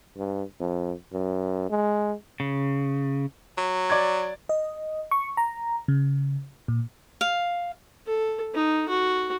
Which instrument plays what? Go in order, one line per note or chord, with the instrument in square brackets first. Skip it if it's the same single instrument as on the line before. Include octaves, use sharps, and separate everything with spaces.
[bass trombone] G2
F2
F#2
G#3
[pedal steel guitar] C#3
[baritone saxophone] F#3
[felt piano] D5 G#6
[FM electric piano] D#5
C#6
A#5
C#3
A#2
[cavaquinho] F5
[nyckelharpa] A4
D#4
F#4